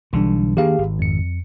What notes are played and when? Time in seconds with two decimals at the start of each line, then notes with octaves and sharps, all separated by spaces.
0.13 B1 D3 E3 G3 D4
0.57 D#3 A#3 D4 G4 G#4 F5
0.78 G#1
0.99 F2 C#7